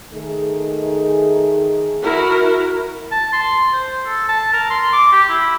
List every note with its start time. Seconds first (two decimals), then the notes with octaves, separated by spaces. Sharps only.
0.12 D#3 A3 G#4
2.01 E4 F#4 A#4
3.12 A5
3.33 C6
3.74 C5
4.06 A4
4.29 A5
4.53 A#4
4.70 C6
4.93 D6
5.12 G4
5.29 E4